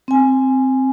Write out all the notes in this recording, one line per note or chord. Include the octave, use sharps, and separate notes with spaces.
C4 G#5